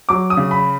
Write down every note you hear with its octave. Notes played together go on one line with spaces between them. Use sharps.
F#3 D6
D#6
C#3
B5